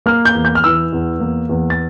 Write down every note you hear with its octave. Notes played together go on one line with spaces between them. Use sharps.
A#3 F6
G6
E2
G6
F6
E3 E6
E2
A#3
E2
A6